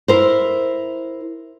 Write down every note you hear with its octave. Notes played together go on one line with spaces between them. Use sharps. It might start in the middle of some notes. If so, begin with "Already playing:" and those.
E4 A#4 C5